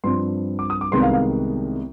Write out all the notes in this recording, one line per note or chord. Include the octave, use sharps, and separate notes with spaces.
G2 F3 C4 C6
D6
D#6
D6
C2 C3 D#3 G#3 B3 C6
F5
F5